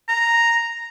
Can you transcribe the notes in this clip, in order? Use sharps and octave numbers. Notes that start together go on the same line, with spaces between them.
A#5